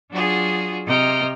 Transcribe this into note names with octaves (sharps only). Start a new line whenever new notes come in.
F#3 D4 F4 F#4 G#4
C3 D#5 G5 A#5 F6